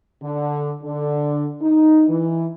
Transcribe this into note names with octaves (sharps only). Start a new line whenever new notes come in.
D3
D3
D#4
E3